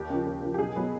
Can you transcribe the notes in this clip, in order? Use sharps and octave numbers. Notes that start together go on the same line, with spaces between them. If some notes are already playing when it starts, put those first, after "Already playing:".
Already playing: D#2 G4
C#3 F3
D#2
C#3 F3
G4
B1 G#4
B2 F#3 B3